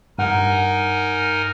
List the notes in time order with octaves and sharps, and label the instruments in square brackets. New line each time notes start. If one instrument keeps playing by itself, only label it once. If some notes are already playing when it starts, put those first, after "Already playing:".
[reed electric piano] G2 F#5 [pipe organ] D#4 A#4 G#5